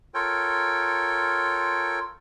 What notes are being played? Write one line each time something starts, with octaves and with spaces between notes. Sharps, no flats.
F4 A4 A#4 C#5 G5